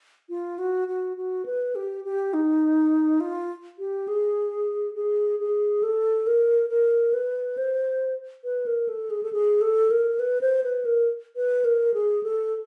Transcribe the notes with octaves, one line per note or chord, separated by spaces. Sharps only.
F4
F#4
F#4
F#4
B4
G4
G4
D#4
F4
G4
G#4
G#4
G#4
A4
A#4
A#4
B4
C5
B4
A#4
A4
G#4
A4
G#4
A4
A#4
B4
C5
B4
A#4
B4
A#4
G#4
A4